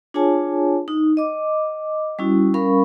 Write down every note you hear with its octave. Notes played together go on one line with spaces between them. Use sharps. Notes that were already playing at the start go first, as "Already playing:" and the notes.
D4 F4 G#4 C#5 G#5 A5
D#4
D#5 D6
G3 C#4 E4 F#4
G3 C#4 A#4 F5 B5 C#6